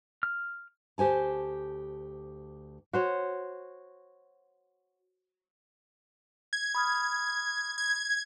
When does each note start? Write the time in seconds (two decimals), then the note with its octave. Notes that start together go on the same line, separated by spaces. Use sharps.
0.23 F6
0.98 D2 G4 C5 G#5 A5
2.93 F#4 C5 C#5
6.53 G#6
6.75 B5 D#6 F6
7.78 G#6